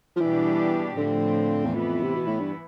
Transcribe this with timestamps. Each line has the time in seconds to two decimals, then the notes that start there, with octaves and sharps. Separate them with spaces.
0.17 F3
0.20 B2 E3 G3 D4 G4
0.97 A2 D3 F3 C4
1.65 E2
1.75 F2 E3 B3 E4
2.03 C3
2.16 B2
2.27 A2
2.40 G2